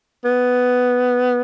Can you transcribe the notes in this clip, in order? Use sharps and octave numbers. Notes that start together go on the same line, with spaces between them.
B3